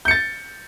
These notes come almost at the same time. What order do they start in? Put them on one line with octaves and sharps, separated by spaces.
G6 C#7 A6